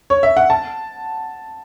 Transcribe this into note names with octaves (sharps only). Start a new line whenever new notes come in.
C#5
E5
F#5
A5